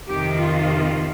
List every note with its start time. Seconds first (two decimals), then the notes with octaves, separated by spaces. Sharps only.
0.08 F2 C3 D#3 G4
0.39 F4